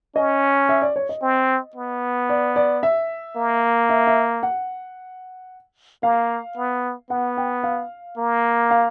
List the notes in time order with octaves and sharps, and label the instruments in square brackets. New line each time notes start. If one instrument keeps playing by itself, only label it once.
[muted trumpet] C#4 [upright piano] D#5
[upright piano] E5
D5
C#5
D#5
[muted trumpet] C4
B3
[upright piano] D5
D5
E5
[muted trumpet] A#3
[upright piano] E5
E5
F#5
[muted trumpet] A#3 [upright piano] F5
[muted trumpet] B3
[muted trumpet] B3 [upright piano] F#5
[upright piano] G5
F5
[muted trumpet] A#3
[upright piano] F5